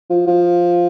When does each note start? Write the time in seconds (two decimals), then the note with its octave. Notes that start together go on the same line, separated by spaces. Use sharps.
0.10 F3
0.27 F3